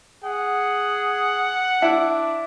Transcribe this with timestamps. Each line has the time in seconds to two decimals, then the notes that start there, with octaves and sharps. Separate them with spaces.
0.24 G#4 F#5
1.82 D4 E4